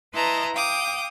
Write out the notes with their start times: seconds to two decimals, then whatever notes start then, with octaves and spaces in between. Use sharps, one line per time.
0.14 E4 B4 D#5 A5 A#5 C6
0.54 F5 G5 D6 D#6